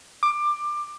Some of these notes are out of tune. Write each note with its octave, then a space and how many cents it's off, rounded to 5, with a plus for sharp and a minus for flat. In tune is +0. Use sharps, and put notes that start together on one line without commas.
D6 +20